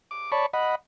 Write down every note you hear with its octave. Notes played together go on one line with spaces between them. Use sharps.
D6
C#5 D5 A5 B5 C#6
D#5 F#5 B5